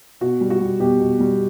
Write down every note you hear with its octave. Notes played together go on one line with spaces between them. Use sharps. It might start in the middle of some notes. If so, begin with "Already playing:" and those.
B2 F#4
G3
F#4
G3
B2 G4
B2
G3